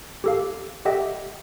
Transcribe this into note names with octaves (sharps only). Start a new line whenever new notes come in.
G4 A4 F5
G4 A4 D#5 E5 F#5 G5